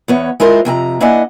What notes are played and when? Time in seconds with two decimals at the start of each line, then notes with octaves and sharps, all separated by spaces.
0.08 E2 B3 C#5
0.40 G#3 E4 F4 A#4 C5
0.65 F2 C3 G#5 A#5
1.01 A#3 D4 E4 D#5 F#5 G#5